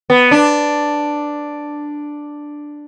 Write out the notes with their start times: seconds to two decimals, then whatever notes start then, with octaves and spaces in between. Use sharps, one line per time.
0.10 B3
0.31 D4